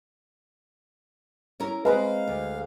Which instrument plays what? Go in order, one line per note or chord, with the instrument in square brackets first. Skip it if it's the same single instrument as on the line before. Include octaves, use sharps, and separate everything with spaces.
[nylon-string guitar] C#4 E4 A#4
[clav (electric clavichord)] G#3 [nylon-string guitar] A#3 C4 A#4 [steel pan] B4 [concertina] F5
[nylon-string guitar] D2